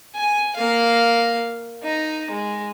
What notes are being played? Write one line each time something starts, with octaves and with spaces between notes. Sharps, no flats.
G#5
A#3 F5
D#4
G#3